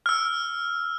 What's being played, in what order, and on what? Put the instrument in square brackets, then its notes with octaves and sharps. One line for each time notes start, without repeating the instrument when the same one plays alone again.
[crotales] E6 F6